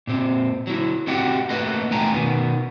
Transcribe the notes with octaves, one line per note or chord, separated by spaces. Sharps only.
A#2 C4
F#3 E4
C4 F#4 G4 D#5 F#5 G5
A3 A#3 B4 D#5 F#5
E2 A#2 A3 G5 G#5 A#5
B2 D#3 B3